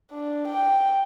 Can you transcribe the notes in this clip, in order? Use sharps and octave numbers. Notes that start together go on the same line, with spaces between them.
D4
G5